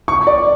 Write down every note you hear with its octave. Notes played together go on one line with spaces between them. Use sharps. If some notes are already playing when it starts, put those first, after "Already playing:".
C#6
D5